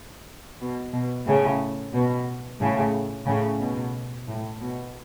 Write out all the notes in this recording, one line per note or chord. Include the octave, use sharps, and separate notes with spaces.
B2
B2
A2 C#3
B2
A2 C#3
A2 C#3
B2
A2
B2